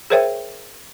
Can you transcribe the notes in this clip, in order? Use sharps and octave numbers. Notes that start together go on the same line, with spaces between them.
G#4 A#4 C5 C#5 E5 G5